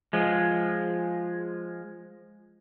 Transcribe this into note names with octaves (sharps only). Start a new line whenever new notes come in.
F3 G#3